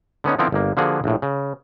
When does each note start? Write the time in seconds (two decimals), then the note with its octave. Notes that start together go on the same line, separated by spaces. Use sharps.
0.24 D3 B3 C#4 D#4
0.39 D3 F3 B3 C4 E4 A#4
0.52 G1 A#3
0.77 D3 F3 A#3 F#4 G#4
1.04 A#1 A2
1.22 C#3